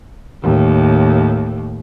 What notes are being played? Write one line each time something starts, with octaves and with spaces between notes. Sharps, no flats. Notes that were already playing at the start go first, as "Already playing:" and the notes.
D#2 A2